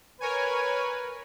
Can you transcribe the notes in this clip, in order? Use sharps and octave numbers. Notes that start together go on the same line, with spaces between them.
A#4 B4 C#5 G#5